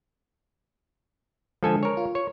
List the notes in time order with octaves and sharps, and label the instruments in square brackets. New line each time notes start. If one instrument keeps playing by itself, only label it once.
[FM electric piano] D3 G#3 [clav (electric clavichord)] F3 A4 G#5
[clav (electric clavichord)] A#4 C#5
[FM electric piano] F4
[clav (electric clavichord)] C#5